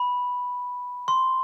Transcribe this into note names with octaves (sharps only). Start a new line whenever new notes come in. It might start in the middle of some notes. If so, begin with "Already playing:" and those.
Already playing: B5
C6